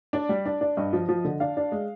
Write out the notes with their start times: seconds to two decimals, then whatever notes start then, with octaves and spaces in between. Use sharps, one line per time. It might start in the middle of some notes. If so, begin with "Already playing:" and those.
0.13 D4 D5
0.29 G3
0.46 D4
0.61 D4
0.77 G2 D#5
0.93 F3
1.09 F3
1.24 D3
1.40 D4 F5
1.57 D4
1.72 G#3